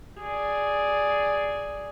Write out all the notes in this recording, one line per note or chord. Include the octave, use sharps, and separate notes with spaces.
G#4 D5